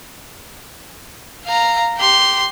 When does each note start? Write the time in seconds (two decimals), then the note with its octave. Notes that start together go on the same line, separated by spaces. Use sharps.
1.46 F5 A#5
1.98 G4 C6